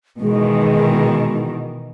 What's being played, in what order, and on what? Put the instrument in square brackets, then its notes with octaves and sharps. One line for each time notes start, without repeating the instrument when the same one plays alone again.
[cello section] B2 D#3 E3 [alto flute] G#3